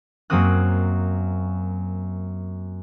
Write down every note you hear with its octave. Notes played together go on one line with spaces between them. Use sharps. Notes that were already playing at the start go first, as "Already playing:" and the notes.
F#2 F#3 A#3 C4 D#6 F#6